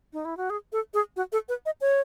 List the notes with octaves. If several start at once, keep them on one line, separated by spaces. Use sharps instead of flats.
D#4
E4
F#4
G#4
A4
G#4
F#4
A4
B4
D#5
C#5